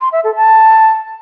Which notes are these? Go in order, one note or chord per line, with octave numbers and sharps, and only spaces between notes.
C6
E5
A4
A5